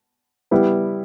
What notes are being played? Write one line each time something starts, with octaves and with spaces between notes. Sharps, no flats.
G3 B3 E4